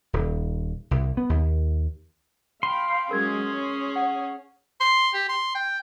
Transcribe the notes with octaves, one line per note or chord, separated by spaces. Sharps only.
D#1
C2
B3
D#2
F5 G5 B5 C6
F#3 G#3 C#4 G#4 A#4 G#6
C#5
F#5
C6
G4
C6
G5